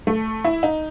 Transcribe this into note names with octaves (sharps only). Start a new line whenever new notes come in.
A3
E4
D#4